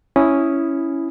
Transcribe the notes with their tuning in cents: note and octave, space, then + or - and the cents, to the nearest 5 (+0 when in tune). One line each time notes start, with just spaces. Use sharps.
C#4 +0 E4 +0 D#6 +0